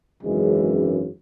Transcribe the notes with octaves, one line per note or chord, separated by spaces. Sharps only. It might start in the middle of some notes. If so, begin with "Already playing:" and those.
G#1 F#2 C#3 E3 G#3